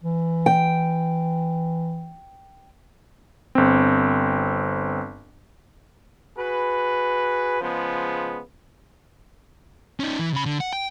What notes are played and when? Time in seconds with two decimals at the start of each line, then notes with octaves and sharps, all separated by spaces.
0.04 E3
0.46 G5
3.55 G1 C4
6.37 F#4 G#4 B4
7.61 C#3 F3 G#3 B3
10.00 C#4 D#4
10.19 E3
10.33 C#3 B5
10.45 D3
10.60 F#5
10.73 G5